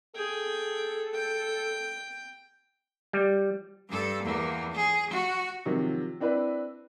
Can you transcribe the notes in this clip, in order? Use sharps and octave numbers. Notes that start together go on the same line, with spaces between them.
G#4 A4 G5
G5
G3
G2 A4
E2 A#3
G#4
F#4
C3 D#3 F3 F#3
C4 D4 E4 B4